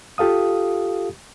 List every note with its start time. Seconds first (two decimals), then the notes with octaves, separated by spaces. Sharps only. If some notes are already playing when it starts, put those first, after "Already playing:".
0.18 F4 G4 A4 F5 D#6